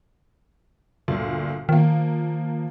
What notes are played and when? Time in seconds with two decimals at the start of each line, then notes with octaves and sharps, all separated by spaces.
1.08 G1 D2 A#2
1.69 D#3 F3 A#3